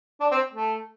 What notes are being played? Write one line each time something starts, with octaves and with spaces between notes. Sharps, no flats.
D4
C4
A3